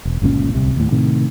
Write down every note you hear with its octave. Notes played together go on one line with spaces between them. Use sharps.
E1
G1 C#2 A#2 C#4
D1 C2 C3
D#2 A2
A2 C3 D#3